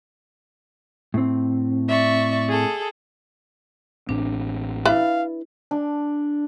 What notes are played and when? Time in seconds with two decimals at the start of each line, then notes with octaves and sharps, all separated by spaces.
1.14 A2 C4
1.88 D5 E5 C#6
2.49 G#4 A4
4.09 A1 A2 C4 D4
4.85 E4 B4 D5 E5 F5
5.71 D4